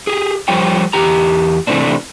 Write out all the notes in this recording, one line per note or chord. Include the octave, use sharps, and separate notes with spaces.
G4 G#4
F3 G3 C5 C#5 G5
E2 G4 A#5
C3 E3 G#3 A3 C4 D4